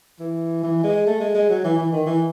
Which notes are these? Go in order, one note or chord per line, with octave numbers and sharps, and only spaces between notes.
E3
E3
G#3
A3
G#3
G#3
F#3
E3
E3
D#3
E3